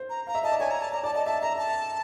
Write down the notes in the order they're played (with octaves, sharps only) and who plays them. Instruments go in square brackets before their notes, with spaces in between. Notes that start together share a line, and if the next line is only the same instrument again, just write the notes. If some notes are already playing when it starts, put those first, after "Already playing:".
Already playing: [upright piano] C5
[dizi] A#5
[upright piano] F5 [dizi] A#5
[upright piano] E5
[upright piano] D#5 [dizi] A5
[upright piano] D5
[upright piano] C#5 [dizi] G#5
[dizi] A#5
A5
[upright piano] D5 [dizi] A#5
[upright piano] D5 [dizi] A5
[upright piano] D#5 [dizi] A5
[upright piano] E5 [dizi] A5
[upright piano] E5 [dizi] A#5
[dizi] A5